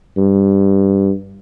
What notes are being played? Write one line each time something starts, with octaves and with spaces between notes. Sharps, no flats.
G2